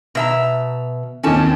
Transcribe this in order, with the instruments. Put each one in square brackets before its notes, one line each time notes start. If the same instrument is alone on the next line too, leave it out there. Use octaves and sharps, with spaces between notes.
[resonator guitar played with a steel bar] B2 E5 A#5
[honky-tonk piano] D#2 D#3 C4 [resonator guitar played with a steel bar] C#4 A5